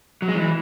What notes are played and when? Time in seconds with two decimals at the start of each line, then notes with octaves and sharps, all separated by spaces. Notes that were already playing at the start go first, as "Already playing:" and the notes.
0.22 F#3
0.28 G#3
0.35 E3